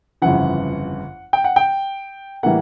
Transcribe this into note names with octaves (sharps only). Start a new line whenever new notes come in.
G1 F2 C#3 E3 F#5
G5
F#5
G5
A2 E3 G3 A#3 F#5